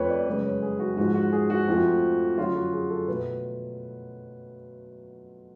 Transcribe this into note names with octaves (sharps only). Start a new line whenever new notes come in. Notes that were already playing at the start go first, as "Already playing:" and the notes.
Already playing: F2 F3 A3 B4 C#5
D5
F#2 C#3 G#3 B4
C#5
G#4
F#4
G#2 F3 G#3 F#4
F#4
G#4
F#4
F2 F3 A3
F#2 D3 F#3 F4
F#4
G#4
A4
B2 A3 B4